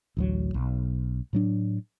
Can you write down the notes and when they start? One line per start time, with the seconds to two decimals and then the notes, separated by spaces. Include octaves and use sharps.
0.17 A1 D2 F#3
0.54 B1
1.33 A2 F#3 D4